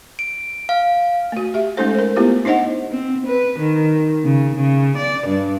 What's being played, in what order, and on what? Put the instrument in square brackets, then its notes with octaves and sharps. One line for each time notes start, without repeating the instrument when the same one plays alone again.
[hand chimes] D7
F5
[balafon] A3 F#4
G4 E5
G#3 A3 C#4 D#4 A4 C5
A#4 C5
A3 B3 E4 F4 G4
D4 D#4 C5 D#5 F#5
[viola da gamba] C4
B4
D#3
C#3
C#3
D5
G2